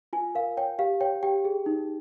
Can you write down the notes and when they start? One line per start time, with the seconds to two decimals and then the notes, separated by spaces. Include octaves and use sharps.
0.13 F4 G#5
0.35 A#4 F5
0.57 C#5 G5
0.79 G4 F5
1.00 C#5 G5
1.23 G4 G5
1.45 G#4
1.66 D#4